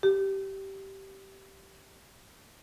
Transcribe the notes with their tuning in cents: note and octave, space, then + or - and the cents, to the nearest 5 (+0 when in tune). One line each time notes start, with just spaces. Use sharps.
G4 -15